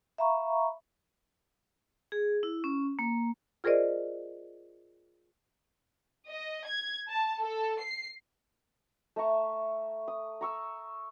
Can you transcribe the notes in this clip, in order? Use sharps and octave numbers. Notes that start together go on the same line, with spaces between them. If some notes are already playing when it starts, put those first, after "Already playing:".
E5 F5 A#5 B5 C#6
G#4
E4
C#4
A#3
F4 G#4 A#4 C5 D5 D#5
D#5
G#6
A5
A4
C7
A3 E5 A#5 C#6
D#6
A#5 C#6 E6